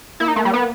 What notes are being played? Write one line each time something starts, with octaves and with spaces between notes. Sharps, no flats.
A#3 E4
D#4
A3
G3
B3